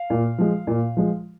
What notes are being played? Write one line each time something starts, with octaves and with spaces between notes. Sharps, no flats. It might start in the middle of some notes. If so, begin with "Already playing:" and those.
Already playing: F5
A#2
F3 G#3
A#2
F3 G#3